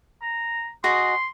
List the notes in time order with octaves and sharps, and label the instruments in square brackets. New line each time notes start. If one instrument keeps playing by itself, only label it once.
[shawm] A#5
[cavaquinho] F#4 G#4 D#5 [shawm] C6